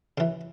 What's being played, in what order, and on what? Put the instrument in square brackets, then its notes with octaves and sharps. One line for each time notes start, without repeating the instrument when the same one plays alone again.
[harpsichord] C#3 E3